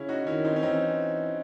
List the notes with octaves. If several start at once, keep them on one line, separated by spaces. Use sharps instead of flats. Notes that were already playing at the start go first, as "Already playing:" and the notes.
Already playing: C#3 C#4 E4
D#4 F#4
D#3 C#4 E4
C4 D#4
C#4
E3 C4 D#4